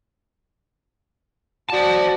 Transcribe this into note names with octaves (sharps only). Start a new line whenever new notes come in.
F#4 C5 D5 A5